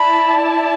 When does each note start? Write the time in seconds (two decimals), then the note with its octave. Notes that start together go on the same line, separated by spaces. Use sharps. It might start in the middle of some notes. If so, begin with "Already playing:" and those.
Already playing: E4 D5 A5 B5